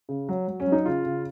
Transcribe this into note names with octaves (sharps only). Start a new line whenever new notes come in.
C#3
F#3
F#3
C#4
F#3
D#4
C#3 F4
C#3